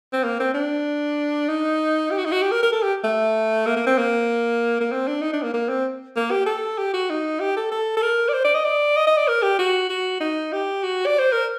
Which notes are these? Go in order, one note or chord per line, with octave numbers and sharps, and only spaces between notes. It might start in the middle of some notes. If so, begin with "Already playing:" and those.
C4
A#3
C4
D4
D#4
G4
F#4
D#4
F#4
G4
A#4
A#4
A4
G4
A3
A#3
A#3
C4
A#3
A#3
C4
D4
D#4
D4
A#3
A#3
C4
A#3
G4
A4
G4
F#4
D#4
G4
A4
A4
A4
A#4
D5
C5
D5
D#5
D5
D#5
D#5
D5
A#4
G4
F#4
F#4
D#4
G4
F#4
D5
C5
A#4